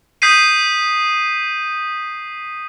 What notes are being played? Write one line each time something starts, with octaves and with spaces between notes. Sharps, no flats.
D#6 G6 B6 C7 D#7